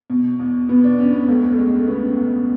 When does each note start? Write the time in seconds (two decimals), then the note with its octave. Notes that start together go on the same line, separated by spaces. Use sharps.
0.10 B2
0.39 E2
0.69 B2 B3
0.84 D4
0.98 E2 C#4
1.13 B3
1.28 C#2 A3
1.52 A3
1.58 C#3 G#3
1.79 A3
1.87 C#3 B3
2.17 C#2